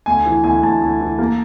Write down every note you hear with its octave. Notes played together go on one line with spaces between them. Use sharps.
D2 G#5
E3
D2 G#5
D2 A5
D2
E3
A#3